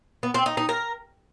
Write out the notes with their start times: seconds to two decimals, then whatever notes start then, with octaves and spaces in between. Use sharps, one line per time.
0.23 B3
0.34 C4
0.46 D#4
0.57 D#4
0.69 A#4